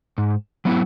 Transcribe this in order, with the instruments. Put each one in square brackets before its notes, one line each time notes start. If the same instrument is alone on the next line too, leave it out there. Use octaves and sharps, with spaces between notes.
[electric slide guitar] G#2
F#3 B3 E4